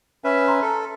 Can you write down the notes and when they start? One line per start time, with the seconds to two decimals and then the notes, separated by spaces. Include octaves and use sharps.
0.24 C#4 B4 E5
0.48 A#5 C6
0.62 A4